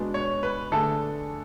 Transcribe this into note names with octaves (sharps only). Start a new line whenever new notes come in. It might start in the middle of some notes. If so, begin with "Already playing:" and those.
Already playing: B2 G#3 B3 D4
C#5
B4
D3 A3 D4 G#4 A4